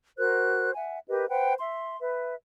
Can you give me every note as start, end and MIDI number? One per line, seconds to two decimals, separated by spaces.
0.18 0.71 66
0.18 0.71 70
0.18 0.71 72
0.18 0.71 90
0.74 0.99 76
0.74 0.99 78
0.74 0.99 80
1.08 1.27 67
1.08 1.27 70
1.08 1.27 71
1.08 1.27 75
1.30 1.54 71
1.30 1.54 72
1.30 1.54 78
1.30 1.54 79
1.61 1.98 76
1.61 1.98 84
2.00 2.34 71
2.00 2.34 76